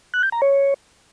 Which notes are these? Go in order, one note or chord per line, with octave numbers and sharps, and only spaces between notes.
F#6
G6
A#5
C#5